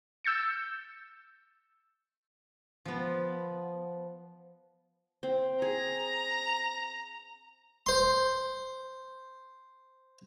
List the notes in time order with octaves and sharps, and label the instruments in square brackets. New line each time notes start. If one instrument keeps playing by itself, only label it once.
[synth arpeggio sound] E6 G6 A6 C#7
[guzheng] F3 B3
[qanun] C4
[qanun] G#4 [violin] A#5
[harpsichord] C5 C6